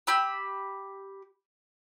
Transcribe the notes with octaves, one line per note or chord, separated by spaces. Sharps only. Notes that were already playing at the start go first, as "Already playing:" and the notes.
G4 B5 E6